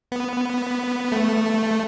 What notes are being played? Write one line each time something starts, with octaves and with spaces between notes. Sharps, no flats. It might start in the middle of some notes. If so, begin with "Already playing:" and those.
B3
A3